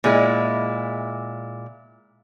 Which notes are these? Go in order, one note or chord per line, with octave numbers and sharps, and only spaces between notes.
A#2 G#3 E4